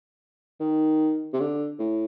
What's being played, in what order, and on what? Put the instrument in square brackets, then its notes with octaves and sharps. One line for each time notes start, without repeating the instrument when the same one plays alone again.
[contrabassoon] D#3
C3
D3
A2